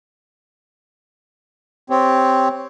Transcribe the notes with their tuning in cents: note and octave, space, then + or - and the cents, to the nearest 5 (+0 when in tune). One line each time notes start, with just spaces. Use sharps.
C4 +0 G4 +0 C#5 +0